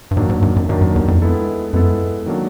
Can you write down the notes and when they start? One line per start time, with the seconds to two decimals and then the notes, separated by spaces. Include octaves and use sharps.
0.11 G2
0.16 G#2 D#3 F#3 A#3 D4
0.29 G#2
0.42 G2
0.56 F#2
0.69 G2 D#3 F#3 A#3 D4
0.81 F#2
0.96 E2
1.08 F2
1.22 G#3 B3 E4 A4
1.73 F#2 G#3 B3 E4 A4
2.26 D#3 F#3 A#3 D4